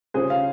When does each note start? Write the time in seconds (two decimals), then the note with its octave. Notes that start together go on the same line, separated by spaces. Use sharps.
0.14 C#3 G3 C#4 F4 G#4 C5
0.30 F5